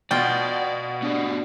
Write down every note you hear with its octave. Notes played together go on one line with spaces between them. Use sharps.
B2 F4 D5 F#5 G5
B3 D4 F#4 G4 D5